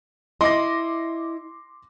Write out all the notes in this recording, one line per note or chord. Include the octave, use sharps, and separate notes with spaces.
E4 D#5 C6 D6 A#6